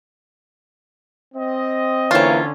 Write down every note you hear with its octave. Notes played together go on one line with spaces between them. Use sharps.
C4 D#5
D3 E3 A#3 C4 C#4 F4 C#5